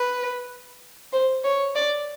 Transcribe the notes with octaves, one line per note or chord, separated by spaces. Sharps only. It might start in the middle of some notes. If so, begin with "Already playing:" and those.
Already playing: B4
C5
C#5
D5